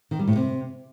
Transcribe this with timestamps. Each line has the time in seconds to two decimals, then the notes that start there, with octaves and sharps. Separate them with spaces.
0.11 D#3
0.19 G3
0.27 A2
0.36 C3